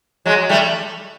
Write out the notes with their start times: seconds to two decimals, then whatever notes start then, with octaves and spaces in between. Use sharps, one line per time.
0.26 F#3 G#3
0.49 G3 A3